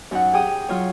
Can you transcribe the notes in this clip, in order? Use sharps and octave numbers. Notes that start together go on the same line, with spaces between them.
F#2 D#4 F#5
G4 G#4 G5 D#6
F#3 F4 C#5